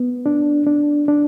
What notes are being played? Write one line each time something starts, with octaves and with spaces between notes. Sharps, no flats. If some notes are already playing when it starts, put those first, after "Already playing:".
Already playing: B3
D4
D4
D4